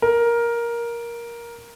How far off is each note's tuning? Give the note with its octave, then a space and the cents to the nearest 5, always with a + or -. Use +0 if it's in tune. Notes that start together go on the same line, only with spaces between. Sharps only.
A#4 +10